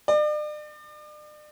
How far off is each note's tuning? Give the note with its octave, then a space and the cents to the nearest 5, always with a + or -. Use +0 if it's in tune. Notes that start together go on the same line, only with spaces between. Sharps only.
D5 +40